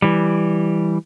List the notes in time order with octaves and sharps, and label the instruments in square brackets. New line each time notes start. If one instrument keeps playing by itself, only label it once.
[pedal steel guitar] E3 G3